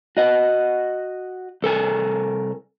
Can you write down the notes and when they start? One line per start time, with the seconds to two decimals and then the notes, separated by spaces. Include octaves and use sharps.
0.17 F#4 D#5 F#5
1.62 C2 A4 A#4 G#5